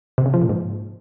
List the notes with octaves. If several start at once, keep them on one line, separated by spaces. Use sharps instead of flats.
C3
C#3
F3
A#2
G#2